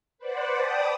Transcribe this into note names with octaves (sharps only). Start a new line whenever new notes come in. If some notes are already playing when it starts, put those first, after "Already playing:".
B4 C5 D5 F#5
D5 G5 A5 B5 D#6